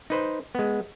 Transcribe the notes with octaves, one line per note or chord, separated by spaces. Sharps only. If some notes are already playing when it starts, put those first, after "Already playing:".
D#4 B4 C5
G#3 B3